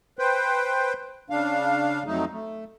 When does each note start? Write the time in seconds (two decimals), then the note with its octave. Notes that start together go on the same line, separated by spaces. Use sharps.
0.19 B4 C5 G5
1.30 C#3 D4 F5
2.07 F2 F#3 A3 D#4
2.32 A3